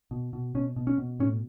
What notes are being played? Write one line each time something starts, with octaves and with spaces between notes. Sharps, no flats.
B2
B2
B2 C#4
B2
C#4
B2
A2 C#4